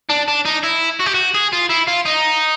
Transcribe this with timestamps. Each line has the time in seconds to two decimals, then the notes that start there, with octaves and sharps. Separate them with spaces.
0.10 D4
0.28 D4
0.45 D#4
0.63 E4
1.00 F#4
1.06 G4
1.14 F#4
1.34 G#4
1.53 F4
1.70 E4
1.88 F4
2.06 D#4